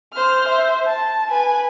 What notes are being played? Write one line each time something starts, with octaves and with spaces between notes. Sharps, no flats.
C5 F6
C5 E5
A5
B4 G#5